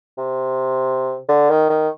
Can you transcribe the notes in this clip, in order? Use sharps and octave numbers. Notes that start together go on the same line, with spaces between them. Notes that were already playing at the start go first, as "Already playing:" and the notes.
C3
D3
D#3
D#3